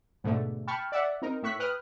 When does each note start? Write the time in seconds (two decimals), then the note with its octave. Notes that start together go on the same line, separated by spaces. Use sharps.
0.24 G#2 B2 D3 A3
0.67 G5 A5 B5 C#6 F6
0.92 D5 E5 F#5
1.22 C4 D#4 A#4
1.43 A2 E5 C#6 F#6 B6
1.59 B4 G5 D#6 F6 F#6